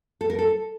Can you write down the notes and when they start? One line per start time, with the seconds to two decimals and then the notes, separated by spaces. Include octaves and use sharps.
0.21 A4
0.30 A#4
0.39 A4